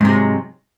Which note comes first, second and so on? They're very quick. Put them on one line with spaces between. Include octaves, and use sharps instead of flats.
G#2 C3 G#3 F#3